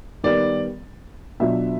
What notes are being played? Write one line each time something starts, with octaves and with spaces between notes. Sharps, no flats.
D#3 G3 B3 D5
B2 F#3 B3 D4 F4 E5